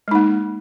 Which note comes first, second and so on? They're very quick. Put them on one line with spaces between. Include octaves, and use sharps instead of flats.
G#3 D#4 A#3